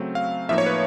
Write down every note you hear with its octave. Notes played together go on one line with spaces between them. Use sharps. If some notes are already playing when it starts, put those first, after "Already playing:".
Already playing: C#3 F#3 A3 C4
F5
A2 F3 A#3 D#4 E5
C#5
B4